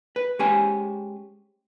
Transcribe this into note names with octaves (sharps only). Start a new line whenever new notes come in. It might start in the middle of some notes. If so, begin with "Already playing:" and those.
B4
G#3 C#4 G4 C5 G#5